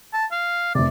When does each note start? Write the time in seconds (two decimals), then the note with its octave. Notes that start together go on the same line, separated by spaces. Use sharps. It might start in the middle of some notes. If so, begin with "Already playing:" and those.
0.14 A5
0.32 F5
0.75 F1 C3 D5